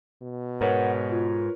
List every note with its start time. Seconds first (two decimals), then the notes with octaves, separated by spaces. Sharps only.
0.22 B2
0.61 G#2 A#4 B4 C#5 F#5
1.10 F4